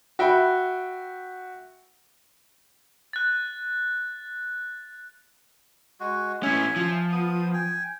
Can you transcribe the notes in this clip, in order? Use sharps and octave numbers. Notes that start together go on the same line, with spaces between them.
F#4 E5 G5 B5
F#6 A6
G#3 F#4
A2 C#4 E5 G#5
F3
B3 D#6
G5 G#5